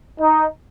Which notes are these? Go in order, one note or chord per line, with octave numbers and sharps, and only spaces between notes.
D#4